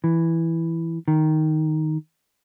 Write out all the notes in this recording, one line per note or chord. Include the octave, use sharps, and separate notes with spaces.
E3
D#3